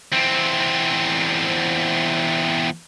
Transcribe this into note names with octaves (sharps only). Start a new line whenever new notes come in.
E2 C4